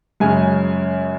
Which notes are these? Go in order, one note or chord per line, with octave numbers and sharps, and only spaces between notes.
F#2 C#3 G#3 C#4 G#5